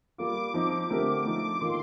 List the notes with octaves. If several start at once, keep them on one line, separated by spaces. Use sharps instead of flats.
G3 A#3 F4 D6
F3 C4 D#4
D3 A3 C4 G4 A#4
F3 A3 D#4 A4 D6
D6
D6
D#3 A#3 F4 A4 C6